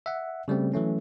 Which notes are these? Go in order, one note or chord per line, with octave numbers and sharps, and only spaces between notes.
E5 F#5
C#3 G3 A3 C4
E3 F#3 A3 C#4